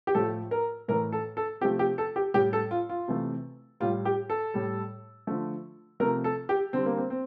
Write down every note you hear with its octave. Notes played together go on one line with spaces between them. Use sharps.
G4
A2 F3 A3 A4
A#4
A2 E3 A3 A#4
A4
A4
C3 F3 A3 G4
G4
A4
G4
A2 G3 G4
A4
F4
F4
C3 E3 A3
A2 G3 F4
G4
A4
A2 G3
D3 F3 A3
C3 F3 A3 A#4
A4
G4
D3 G3 C4
A#3
C4
C4